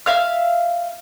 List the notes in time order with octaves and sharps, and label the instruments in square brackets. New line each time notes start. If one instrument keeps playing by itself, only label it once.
[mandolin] E5 F5 F6